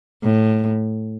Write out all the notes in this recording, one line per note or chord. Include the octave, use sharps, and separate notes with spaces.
A2